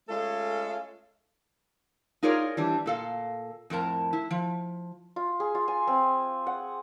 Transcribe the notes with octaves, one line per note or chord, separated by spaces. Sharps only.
G#3 A3 C#4 F4 A4
D#4 F4 G#4 A#4 C#5 D5
E3 G3 D4
A#2 A4 F5
F2 A2 A#4 A5
E4
F3
F4
G#4
F4
G#5
C4
F#5